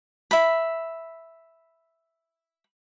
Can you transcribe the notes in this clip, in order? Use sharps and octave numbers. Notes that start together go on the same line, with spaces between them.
E5 B5